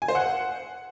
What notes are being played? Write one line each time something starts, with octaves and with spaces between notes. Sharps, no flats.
G#5
C5
F#5